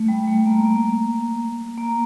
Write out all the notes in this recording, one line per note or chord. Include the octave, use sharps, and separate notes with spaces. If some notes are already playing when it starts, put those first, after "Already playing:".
Already playing: A3
G3
A3
A#3
A#3
A#3